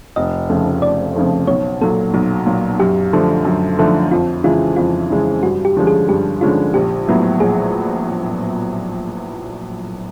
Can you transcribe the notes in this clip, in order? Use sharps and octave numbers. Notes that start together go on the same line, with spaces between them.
F1 D#5
F2 C#3 F3 A3
F1 D5
F2 C#3 F3 A3
B1 C#5
A#2 F#3 A4
B1
A#2 F#3
F#2 G4
D3 F3 A3
F#2
D3 F3 A3
F2 F4
C#3 E3 G#3 F4
F2 F4
C#3 E3 G#3
G2 F#4
G4
D3 F3 G#3 C#4
G#4
G2 G4
D3 F3 G#3 C#4 F4
A#1 G4
A2 F#3 B3 E4
A#1 G#4